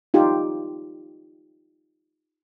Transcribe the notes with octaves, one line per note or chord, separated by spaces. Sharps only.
D#4 F4 G4